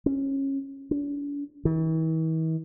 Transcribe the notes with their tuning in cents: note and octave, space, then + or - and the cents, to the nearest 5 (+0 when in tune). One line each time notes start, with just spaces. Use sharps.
C#4 -20
D4 -45
E3 -45